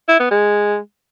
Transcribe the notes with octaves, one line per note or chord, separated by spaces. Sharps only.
E4
B3
G#3